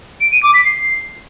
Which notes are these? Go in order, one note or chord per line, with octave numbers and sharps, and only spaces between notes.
D7
D#7
D6
B6
C7